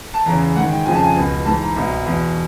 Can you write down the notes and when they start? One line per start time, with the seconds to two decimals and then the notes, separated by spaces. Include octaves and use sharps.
0.14 A5
0.26 E2 C#3 E3 A#5
0.56 G#2 F#5
0.60 D#3
0.71 G5
0.85 F2 C#3 F3 G#5
0.95 A5
1.03 G#5
1.16 C#2 B2
1.46 G#2 E3 A5
1.61 A#5
1.76 C2 B2
2.06 E2 B2